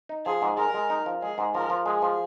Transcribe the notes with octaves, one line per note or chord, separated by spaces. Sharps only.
D#4
F3 G#4
G#2
G#3 A#4
G#3
D#4
F3
G#3 G#4
G#2
F3 A#4
F3
G#3 G#4
F3